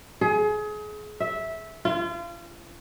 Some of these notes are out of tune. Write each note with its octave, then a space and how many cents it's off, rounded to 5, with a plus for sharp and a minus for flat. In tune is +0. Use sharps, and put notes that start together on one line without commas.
G#4 +30
E5 -10
F4 -35